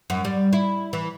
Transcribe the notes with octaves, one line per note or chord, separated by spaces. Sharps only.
F#2
G3
E4
E3